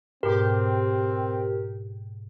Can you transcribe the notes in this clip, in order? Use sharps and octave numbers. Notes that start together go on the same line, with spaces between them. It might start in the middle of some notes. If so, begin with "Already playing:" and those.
G#2 B2 C4 G4 A#4